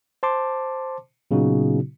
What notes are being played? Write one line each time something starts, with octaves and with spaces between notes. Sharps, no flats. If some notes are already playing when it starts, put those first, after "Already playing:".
C5 A5 C6 D6
A#2 C#3 F#3 B3 D#4 F#4